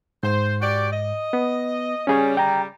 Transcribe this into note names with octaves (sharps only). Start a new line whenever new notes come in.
G#2 C5
F#4 G4 D5
D#5
B3
C#3 G3 C#4 G#4 C#5
G5 A#5